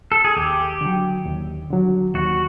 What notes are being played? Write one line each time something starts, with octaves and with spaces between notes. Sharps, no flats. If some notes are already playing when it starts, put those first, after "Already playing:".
A4
G#4
D#2 G4
D3 F#3
D#2
D3 F#3
D#2 F#4